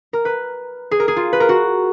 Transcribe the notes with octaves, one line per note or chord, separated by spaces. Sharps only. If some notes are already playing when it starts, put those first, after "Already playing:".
A#4
B4
G#4
A#4
G#4
F4
B4
A#4
F#4